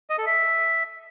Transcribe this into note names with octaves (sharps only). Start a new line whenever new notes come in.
D#5
A4
E5